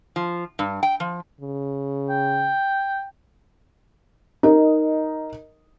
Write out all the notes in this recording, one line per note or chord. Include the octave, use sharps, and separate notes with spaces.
F3
G2
G5
F3
C#3
G5
D#4 A#4 D#5